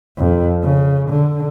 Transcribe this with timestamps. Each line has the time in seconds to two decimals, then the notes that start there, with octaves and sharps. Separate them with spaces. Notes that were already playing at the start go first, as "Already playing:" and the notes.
0.18 F2
0.63 C#3
1.10 D3